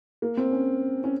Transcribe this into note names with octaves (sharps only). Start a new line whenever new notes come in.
A#3
C4
C#4
C#4